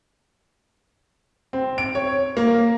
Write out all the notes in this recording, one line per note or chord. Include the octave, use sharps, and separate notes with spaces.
C4
D7
C#5
A#3